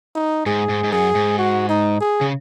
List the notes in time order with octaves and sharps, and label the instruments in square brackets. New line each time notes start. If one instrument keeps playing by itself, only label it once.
[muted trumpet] D#4
[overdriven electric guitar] G#2 [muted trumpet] G#4
[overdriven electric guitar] G#2
G#2
[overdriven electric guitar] F#2 [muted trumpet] G#4
[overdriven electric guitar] G#2
[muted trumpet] F#4
D#4
G#4
[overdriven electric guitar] C#3